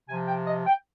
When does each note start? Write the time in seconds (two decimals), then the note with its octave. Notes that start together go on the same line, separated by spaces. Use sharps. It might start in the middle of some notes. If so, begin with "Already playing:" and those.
0.09 C3 F3 G#5
0.28 G5
0.47 D#5
0.66 G5